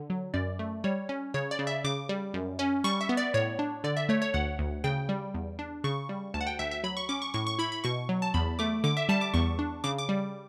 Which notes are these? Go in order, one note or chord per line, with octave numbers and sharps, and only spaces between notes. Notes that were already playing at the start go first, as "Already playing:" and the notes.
Already playing: D3
F#3
F#2 D5
A3
G3 C#5
C#4
C#3 C#5
D5
C#3
E5
C#3 D6
G3
F#2
C#4
G3 C#6
E5
B3
D5
A2 C#5
D4
D3 D5
E5
A3 C#5
C#5
D2 F#5
D2
C#3 G5
G3
E2
D4
C#3 C#6
G3
D2 A5
F#5
G5
D2 E5
E5
F#3 B5
C#6
C#4 D6
C#6
A2 C#6
C#6
E4 B5
B5
B2 C#6
F#3
A5
E2 B5
A3 D6
D3 D6
E5
G3 A5
D6
E2 C#6
D4
C#3 D6
D6
G3